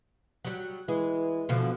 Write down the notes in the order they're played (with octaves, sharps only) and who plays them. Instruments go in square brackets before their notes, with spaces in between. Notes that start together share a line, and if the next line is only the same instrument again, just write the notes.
[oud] F#3 G3
[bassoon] E3 [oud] G#3
[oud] B2 D3 F3